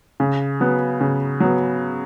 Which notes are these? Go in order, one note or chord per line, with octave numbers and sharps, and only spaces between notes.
C#3
F#3 B3
C#3
F#3 B3